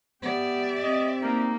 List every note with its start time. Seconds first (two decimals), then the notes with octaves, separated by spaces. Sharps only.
0.22 B3 G4 D5 E5
0.83 C4 D#5
1.22 A#3 D#4